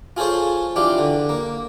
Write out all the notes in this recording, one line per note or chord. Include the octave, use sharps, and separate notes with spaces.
F4 G#4 A4 C5 C#5
E3 D4 F4 G4
D3
A#3